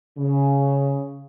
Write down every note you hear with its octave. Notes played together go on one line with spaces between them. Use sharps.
C#3